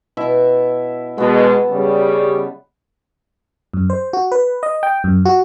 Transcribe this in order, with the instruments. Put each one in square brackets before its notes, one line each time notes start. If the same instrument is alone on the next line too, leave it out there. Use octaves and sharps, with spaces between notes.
[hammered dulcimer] B2 E4 E5
[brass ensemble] B2 G#3 [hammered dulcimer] B3 A5
[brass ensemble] C#3 G3
[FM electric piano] F#2
C5
F#4
B4
D#5
G5
F#2
F#4